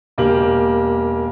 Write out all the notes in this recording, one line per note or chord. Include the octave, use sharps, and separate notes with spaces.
E1 A#3 G4 F#7